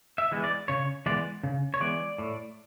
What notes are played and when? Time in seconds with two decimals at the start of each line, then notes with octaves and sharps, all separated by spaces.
0.18 E5
0.32 E3 G#3 B3
0.44 D5
0.68 C#3 C#5
1.06 E3 G#3 B3 D5
1.44 C#3
1.74 C#5
1.80 E3 G#3 B3 D5
2.18 A2